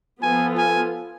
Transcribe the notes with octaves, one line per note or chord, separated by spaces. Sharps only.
F3 B3 F4 A4 G#5
G#5